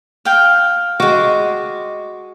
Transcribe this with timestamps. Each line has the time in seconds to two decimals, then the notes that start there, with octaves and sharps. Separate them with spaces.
0.25 F5 G5
1.00 G#3 F#4 D6